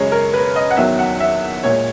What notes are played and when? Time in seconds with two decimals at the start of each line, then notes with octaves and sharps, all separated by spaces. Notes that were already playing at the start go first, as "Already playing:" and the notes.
Already playing: F#2 C#3 G#3 C#5
0.12 A#4
0.34 B4
0.56 D#5
0.71 F#5
0.77 E2 D#3 F#3 E5
0.99 F#5
1.20 E5
1.63 A#2 G#3 C#5